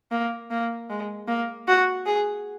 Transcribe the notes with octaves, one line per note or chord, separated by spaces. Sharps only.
A#3
A#3
G#3
A#3
F#4
G#4